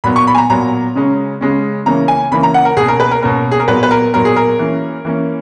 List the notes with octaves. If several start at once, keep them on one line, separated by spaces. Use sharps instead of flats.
A#2 F#3 B3 B5
C#6
B5
G#5
A#5
A#2 F#3 B3 A#5
C#3 G#3 C#4
C#3 G#3 C#4
C#3 E3 A#3 C#4 A#5
G#5
C#3 E3 A#3 C#4 B5
A#5
F#5
A#4
B2 A#3 C#4 G#4
A#4
B4
A#4
B2 A#3 C#4 A#4
G#4
A#4
A#2 F#3 B3 B4
B4
A#4
A#2 F#3 B3 A#4
G#4
A#4
E3 A#3 C#4
E3 A#3 C#4